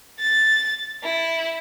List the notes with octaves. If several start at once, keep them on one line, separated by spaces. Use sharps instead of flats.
A6
E4